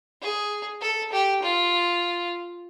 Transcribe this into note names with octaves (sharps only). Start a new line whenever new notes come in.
G#4
A4
G4
F4